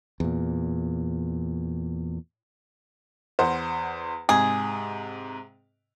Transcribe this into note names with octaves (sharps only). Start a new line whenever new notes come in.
E2 A#2
E2 C5 F#5
G#2 C3 G#4